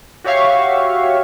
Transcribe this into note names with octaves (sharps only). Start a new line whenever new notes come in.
F#4 G4 C#5 E5 F5 C#6